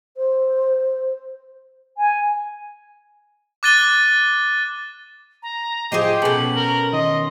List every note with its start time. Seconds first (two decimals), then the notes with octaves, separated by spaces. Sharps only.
0.17 C5
1.97 G#5
3.63 D6 F#6 A6 D#7 G7
5.43 A#5
5.92 A2 F3 G4 G#4 C5 D#5 D6 C7
6.22 B2 C#4 A4 B4 A5 F#7
6.56 A#4
6.93 D#3 D#5 C6